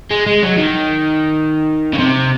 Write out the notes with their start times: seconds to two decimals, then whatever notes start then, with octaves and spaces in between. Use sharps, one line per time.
0.11 G#3
0.26 G#3
0.43 F#3
0.58 D#3
1.93 C#3
1.99 C3